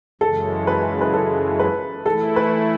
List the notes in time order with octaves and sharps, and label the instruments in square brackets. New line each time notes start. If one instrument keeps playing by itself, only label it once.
[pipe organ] F#2 C#3 E3 G#3 [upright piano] A4
[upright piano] B4
B4
A4
B4
[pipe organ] E3 A3 E4 [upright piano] A4
[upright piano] B4